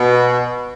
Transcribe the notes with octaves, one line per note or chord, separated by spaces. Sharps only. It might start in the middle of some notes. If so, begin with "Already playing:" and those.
Already playing: B2